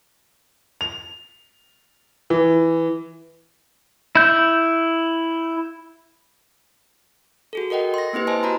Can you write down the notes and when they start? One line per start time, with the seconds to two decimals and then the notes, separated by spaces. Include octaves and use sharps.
0.81 F7
2.30 E3
4.15 E4 G6
7.53 F#4 G#4 A4
7.70 A4 A#4 D#5 F#5 G5
7.94 C6 A#6
8.13 A#3 C4 E4 G4 B4
8.27 C5 D#5 G#5 A5 C6
8.43 F#4 A#5 B5